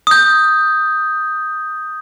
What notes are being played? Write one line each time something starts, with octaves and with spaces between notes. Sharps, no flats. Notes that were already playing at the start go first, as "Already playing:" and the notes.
D#6 G6